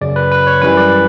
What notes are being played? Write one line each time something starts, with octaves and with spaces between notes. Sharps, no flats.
F#2 C#3 F#3 D5
B4
B4
C#5
F#2 E3 G3 B4
D5